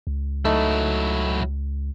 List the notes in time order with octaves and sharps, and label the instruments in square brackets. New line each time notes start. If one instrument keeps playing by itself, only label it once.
[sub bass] C#2
[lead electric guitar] F#3 E4 [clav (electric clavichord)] A3 D#4